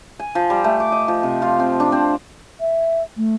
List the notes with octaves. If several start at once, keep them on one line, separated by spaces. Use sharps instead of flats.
G#5
F3
G3
A3
D6
D#5
F3
C3
F4
C4
D4
C4
E5
A3